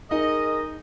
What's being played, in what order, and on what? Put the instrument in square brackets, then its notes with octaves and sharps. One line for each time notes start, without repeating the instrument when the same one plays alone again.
[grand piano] D#4 [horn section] G#4 A#4 D#5